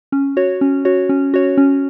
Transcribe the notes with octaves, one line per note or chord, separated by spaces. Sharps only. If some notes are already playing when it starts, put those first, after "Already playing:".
C#4
F#4 C#5
C#4
F#4 C#5
C#4
F#4 C#5
C#4